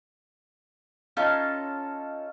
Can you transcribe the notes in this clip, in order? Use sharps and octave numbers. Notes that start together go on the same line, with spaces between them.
C#4 D#4 F4 A4